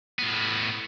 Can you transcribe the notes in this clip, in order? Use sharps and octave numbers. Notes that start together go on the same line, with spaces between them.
A2 B3